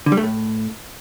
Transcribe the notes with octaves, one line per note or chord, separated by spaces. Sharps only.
D3
G3
A3
A2